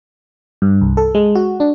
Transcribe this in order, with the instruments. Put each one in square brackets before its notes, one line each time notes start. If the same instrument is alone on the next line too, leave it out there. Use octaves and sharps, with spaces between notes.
[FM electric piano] G2
C2
A4
G#3
F#4
D4